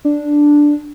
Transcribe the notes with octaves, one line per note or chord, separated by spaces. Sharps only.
D4